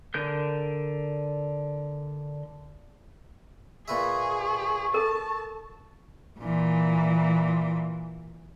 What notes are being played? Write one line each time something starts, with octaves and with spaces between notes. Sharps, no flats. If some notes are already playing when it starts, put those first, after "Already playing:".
D3 A#4 G6
A#2 G#4 B4 E5 C#6
A4 A#4 A5
A#2 E3